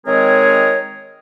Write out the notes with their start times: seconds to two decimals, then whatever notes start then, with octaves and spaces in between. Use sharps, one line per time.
0.06 D#3 G#3 C4 G#4 A#4 C#5